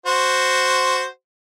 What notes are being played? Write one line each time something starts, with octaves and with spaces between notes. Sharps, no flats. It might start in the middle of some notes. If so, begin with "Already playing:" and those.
F#4 C5